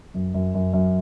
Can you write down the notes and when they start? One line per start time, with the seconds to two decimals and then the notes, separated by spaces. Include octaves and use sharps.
0.14 F#2
0.34 F#2
0.54 F#2
0.73 F#2